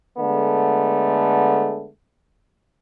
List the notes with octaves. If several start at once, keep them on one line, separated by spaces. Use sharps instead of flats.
D3 G#3 A3 B3